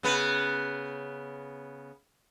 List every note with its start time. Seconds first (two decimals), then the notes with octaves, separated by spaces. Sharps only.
0.03 C#3 B3 B4